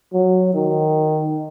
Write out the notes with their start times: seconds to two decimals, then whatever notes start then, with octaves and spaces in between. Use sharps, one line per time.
0.13 F#3
0.54 D#3